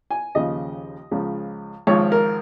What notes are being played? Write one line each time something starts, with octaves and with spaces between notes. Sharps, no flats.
G#5
D#2 C#3 F3 D#5
C#2 C#3 F3
G#1 G#2 F3 C#5
A#4